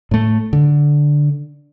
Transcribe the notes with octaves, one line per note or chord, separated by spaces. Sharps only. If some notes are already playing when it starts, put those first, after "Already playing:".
A2 A3
D3